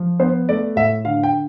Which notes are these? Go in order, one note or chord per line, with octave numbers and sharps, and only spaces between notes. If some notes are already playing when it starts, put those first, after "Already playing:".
Already playing: F3
B3 C5
A3 D5
A2 E5
D3 F5
G5